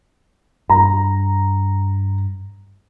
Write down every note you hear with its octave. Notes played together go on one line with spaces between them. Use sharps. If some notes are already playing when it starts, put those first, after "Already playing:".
G2 A#5